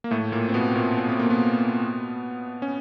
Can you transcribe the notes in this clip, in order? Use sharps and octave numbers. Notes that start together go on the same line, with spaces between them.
A#3
A2 A3
A#2 A#3
C4
B2 B3
A#2 A#3
C4
B3
A#3
B2 B3
C#4